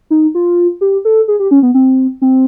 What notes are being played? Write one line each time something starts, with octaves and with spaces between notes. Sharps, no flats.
D#4
F4
G4
A4
G#4
G4
C#4
B3
C4
C4